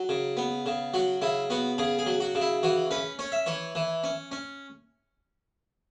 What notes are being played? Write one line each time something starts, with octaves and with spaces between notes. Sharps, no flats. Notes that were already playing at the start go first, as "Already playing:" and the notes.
Already playing: F#3
C#3
B3
C#3
F#3 F#4
C#3 E4
B3 F#4
C#3 G#4
G#4
F#3
F#4
C#3
E4
E3 F#4
C#4 B4
C#4 C#5
E5
E3 C#5
E3
C#4
C#4